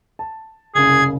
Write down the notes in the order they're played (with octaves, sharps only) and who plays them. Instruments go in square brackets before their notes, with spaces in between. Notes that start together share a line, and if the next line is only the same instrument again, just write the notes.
[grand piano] A5
[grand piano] F#1 C2 C#3 [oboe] G#4 [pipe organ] G#6